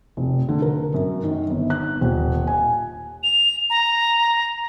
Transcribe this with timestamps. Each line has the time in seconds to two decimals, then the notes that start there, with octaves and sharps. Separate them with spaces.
0.17 F1
0.49 D3
0.62 A#4
0.94 F#2
1.23 D#3
1.50 G1
1.70 F#6
2.01 D#1
2.47 G#5
3.23 F7
3.70 A#5